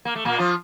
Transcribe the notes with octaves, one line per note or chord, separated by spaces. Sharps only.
A#3
A3
A#2 A#3
F3 F4